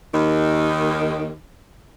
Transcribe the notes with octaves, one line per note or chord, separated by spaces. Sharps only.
D#2 D#3